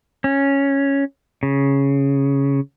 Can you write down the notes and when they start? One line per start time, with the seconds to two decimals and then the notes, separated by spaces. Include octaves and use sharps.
0.24 C#4
1.43 C#3